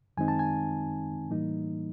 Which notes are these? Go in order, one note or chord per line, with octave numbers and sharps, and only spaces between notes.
F#2 D#3 G#3 C4 D#4 G#5
A5
G#5
A2 E3 G3 A#3 D#4